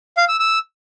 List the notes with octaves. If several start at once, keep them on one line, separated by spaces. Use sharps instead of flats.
F5
E6
E6